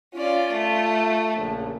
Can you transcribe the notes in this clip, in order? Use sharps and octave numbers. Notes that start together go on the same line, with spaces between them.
C#4 F4 D5
A3
A#1 C#3